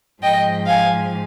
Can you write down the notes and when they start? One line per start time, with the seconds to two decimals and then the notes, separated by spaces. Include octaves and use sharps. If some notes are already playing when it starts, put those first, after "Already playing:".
0.22 G#2 F3 D#5 G5
0.67 F5 G#5